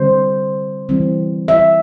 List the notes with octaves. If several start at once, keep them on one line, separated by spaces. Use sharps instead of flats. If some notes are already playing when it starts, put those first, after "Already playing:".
Already playing: D3 G3 C4 C5
E3 G3 C4
E5